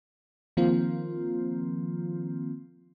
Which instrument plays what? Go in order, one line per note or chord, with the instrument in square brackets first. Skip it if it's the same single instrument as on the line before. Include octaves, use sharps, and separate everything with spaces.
[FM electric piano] D#3 F3 A#3 C4 F4